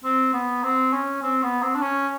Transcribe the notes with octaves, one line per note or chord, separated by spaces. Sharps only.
C4
B3
C4
C#4
C4
B3
C4
D4
C#4